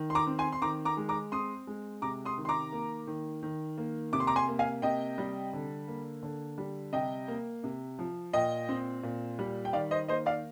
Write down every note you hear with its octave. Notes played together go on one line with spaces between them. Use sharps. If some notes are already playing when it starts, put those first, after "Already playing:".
Already playing: D#3
C6
A#5 D6
C4
G#5 C6
C6
D#3 A#5 D6
A#5 D6
G#3
A#5 D6
C4 C6 D#6
G#3
C3 A#5 D6
C6 D#6
D#3
C6
A#5 D6
A#3
D#3
D#3
A#3
C3 D6
C6
A#5 D6
G#5 C6
A#3
F5 G#5
C3 D#5 G5
G3
D3
A#3
D3
G3
C3 D#5 G5
A#3
C3
F3
A#2 D#5 G5
C4
A#2
G3
G5
D#3 D5 F5
C5 D#5
A#3 C5 D#5
D5 F5